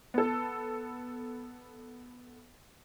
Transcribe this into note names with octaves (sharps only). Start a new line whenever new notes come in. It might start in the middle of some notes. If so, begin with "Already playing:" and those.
B3 A4